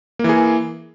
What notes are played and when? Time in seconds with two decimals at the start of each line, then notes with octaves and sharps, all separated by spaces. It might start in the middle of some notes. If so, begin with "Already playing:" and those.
0.19 A#3
0.24 E3
0.29 G#4